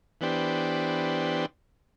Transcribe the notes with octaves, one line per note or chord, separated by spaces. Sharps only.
E3 B3 D4 G4 C5